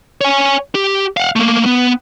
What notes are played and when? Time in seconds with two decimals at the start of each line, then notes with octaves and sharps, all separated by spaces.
0.21 C#5 G#5
0.75 G4
1.17 F5 F#5
1.36 A3 A#3
1.66 B3